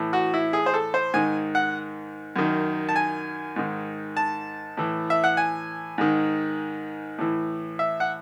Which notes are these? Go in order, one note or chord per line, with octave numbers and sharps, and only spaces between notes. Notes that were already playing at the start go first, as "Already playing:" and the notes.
Already playing: A2 E3
F#4
E4
G#4
C5
A4
C5
G#2 D#3 G#5
F#5
F#2 D#3
A5
G#5
G#2 D#3
A5
A2 E3
E5
F#5
G#5
G#2 D#3
A2 E3
E5
F#5